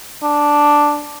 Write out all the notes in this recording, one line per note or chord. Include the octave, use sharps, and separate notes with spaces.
D4